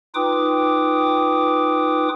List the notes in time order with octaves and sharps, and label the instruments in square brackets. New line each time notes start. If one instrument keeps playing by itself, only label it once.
[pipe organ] D#4 F4 B4 G5 D6 D#6